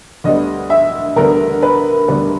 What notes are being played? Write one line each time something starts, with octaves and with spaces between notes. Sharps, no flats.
D2 D3 G3 B3 D#5
E5
D2 D3 G3 B3 A#4
B4
D2 D3 G3 B3 B4